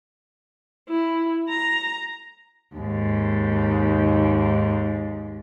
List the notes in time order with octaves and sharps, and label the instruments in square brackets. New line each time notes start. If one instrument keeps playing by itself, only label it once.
[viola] E4
A#5
[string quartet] D#2 G#2